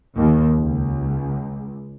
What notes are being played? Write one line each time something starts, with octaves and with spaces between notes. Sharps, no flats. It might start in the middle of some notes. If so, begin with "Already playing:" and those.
D#2
C#2